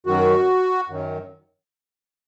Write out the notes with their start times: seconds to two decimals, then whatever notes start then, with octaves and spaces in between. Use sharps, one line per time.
0.06 F#2 D#3 F#3 F#4
0.89 F#2 D#3 F#3